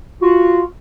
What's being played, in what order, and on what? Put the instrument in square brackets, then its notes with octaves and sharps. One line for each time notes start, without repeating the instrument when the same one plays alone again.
[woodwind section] F4 F#4